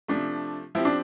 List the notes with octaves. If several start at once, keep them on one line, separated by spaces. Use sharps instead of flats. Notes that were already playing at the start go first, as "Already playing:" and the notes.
C3 F3 A3 D4
F3 C4 E4 G4
D4